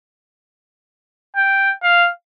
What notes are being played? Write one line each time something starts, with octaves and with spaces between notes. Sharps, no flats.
G5
F5